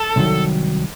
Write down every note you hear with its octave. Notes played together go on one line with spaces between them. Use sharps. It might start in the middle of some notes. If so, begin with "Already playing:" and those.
Already playing: A4
C2 C3 D#3 F#3